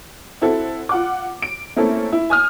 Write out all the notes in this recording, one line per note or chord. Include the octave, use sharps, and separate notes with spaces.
C4 E4 F#4 A4
F4 F#5 D6
D7
A3 A#3 C4 C#4 E4 A4
E4
G#5 D#6 F6